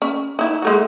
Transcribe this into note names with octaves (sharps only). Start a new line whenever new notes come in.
C#4
D#4 E4
G#3 A3 F#4